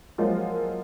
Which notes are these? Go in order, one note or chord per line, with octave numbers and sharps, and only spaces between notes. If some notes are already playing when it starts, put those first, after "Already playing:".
F3 F#3 G#3 A#3 F4